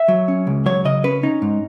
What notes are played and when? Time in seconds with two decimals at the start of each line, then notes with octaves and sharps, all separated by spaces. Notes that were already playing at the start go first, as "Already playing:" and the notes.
Already playing: E5
0.08 F#3
0.28 C#4
0.47 C#2
0.66 F#3 C#5
0.85 C#3 D#5
1.04 C#4 B4
1.23 C#4 D#4
1.42 G#2